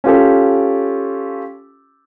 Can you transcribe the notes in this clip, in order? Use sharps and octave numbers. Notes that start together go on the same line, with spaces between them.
C#4 F4 G4 A4